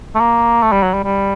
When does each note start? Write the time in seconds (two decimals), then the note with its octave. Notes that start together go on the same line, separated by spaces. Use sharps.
0.15 A3
0.20 A#3
0.62 A3
0.72 G3
0.83 F#3
0.94 G3
1.04 G3